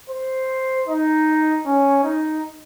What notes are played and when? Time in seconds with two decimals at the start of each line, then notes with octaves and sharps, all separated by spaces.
0.10 C5
0.88 D#4
1.66 C#4
2.04 D#4